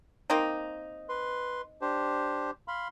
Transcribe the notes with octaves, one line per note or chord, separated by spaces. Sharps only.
A#3 C4 D#4
B4 C6
D4 G4 C5
F5 B5 C6